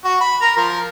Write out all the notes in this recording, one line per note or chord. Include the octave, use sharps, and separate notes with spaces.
F#4
B5
A#4 A#5
F3 A#4